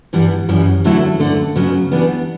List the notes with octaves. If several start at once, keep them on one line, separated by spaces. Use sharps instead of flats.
G2 E3 G3 B3
F#2 E3 G3
E2 D3 F#3 A3 E4
D2 D3 A3
C#3 F#3 B3
E3 G3 B3 D4